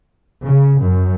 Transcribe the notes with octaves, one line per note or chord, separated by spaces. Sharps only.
C#3
F#2